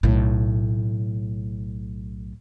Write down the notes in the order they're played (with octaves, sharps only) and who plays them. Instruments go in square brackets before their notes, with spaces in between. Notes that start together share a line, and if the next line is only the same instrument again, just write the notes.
[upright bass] B1 A2